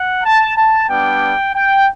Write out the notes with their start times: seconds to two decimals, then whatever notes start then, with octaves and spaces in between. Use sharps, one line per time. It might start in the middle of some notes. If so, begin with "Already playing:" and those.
Already playing: F#5
0.24 A5
0.56 A5
0.88 G3 B3 D4 G5
1.53 G5